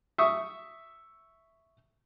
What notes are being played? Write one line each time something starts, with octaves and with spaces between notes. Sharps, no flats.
E5 C#6 D#6